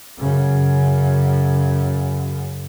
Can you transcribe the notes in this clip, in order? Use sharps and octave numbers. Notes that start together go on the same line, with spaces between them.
F#2 C#3